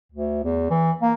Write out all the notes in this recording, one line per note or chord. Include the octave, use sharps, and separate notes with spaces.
D2
E2
E3
A#3